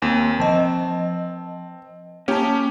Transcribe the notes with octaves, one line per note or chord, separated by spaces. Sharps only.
D#2 A#3 C4 G#5
F3 C4 D#5 A5
A#3 C#4 D#4 G4 A5